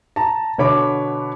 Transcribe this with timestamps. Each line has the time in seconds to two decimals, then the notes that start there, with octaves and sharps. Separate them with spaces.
0.16 A5 A#5
0.58 B2 D3 C#5 B5 D6